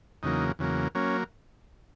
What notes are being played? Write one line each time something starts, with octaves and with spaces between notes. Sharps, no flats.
E2 C#3 F#3 A#3 D#4
E2 C#3 F#3 A#3
F#3 A#3 C#4